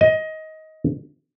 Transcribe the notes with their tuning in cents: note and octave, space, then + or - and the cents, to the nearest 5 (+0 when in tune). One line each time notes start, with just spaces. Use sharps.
D#5 +20